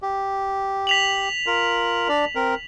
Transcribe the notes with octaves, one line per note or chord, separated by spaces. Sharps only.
G4
B6 F7 F#7
F4 A#4
D4 D5
C4 A#4